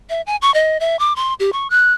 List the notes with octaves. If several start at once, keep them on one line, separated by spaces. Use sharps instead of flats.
E5
G#5
C#6
D#5
E5
D6
C6
G4
C#6
F#6